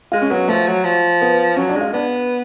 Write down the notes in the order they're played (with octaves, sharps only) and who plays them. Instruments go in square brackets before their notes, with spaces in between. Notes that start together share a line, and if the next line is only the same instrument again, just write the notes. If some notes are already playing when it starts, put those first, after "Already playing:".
[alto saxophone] G#3 [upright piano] F4
[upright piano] C#4
[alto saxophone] F#3 [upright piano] B3
[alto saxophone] F3 [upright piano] A3
[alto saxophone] F#3
F3
[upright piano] B3
[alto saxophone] F#3 [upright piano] C#4
[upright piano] D4
[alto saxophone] G#3
[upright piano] F4
[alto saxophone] B3 [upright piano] D4